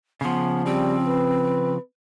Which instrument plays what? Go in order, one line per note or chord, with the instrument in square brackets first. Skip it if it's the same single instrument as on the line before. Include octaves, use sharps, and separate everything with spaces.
[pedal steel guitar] C#3 F3 [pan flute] B3
[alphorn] G3 [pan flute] C4
[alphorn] B4